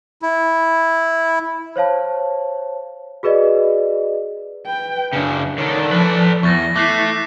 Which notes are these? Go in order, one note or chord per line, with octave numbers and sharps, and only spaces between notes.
E4
C5 C#5 F5 A5
F#4 G#4 B4 D5 D#5
B4 G5
F#2 C#3 D4
D3 D#3 C#5 D5 A5
F3 A4 B4
E2 E4 C#6 A6 A#6
A3 D6 F#6 A6 C7